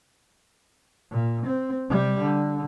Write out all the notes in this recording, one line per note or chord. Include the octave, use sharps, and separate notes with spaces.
A#2
C4
C3 G3
D3